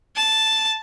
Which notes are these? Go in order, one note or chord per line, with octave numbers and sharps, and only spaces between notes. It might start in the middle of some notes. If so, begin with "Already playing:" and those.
A5